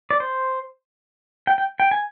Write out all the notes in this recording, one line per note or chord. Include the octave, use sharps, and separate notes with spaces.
D5
C5
G5
G5
G5
G#5